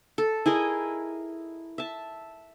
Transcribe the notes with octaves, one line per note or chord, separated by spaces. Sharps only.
A4
E4 G#4 A#4 D#5
E5 A5